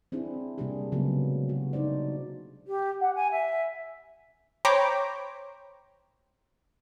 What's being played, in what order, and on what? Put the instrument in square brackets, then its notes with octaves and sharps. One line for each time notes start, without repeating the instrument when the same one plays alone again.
[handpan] C4 D4 E4 G#4
C3 G3 A#3 D4 G4 G#4
C#3 F#3 G#3 A#3 B3
F#4
D4 D#4 C5 D5
[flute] G4
F#5
G#5
E5
[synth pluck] C5 C#5 G5 A#5 B5 D6